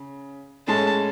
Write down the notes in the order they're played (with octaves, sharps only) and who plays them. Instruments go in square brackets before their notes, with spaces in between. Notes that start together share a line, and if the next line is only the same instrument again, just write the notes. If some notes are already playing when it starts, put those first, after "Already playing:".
Already playing: [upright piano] C#3
[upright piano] A2 G#3 C#4 G#4 [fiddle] A5